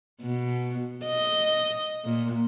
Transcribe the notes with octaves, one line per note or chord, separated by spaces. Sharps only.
B2
D#5
A#2